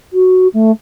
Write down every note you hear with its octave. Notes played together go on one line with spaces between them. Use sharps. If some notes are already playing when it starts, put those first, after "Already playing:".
F#4
A3